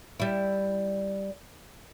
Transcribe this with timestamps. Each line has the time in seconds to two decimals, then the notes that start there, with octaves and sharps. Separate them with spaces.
0.20 G3 E4